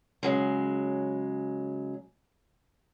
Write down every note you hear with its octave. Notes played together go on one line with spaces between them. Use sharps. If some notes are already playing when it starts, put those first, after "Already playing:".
C#3 F#3 G#3